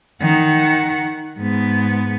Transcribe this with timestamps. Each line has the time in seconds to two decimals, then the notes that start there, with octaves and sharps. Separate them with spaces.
0.20 D#3 F#5
1.38 G#2 B3